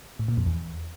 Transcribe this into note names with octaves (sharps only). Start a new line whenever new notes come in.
A2
A#2
F2
E2